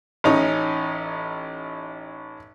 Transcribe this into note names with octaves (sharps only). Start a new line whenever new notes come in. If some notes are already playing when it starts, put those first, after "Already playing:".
A1 C#4 D#4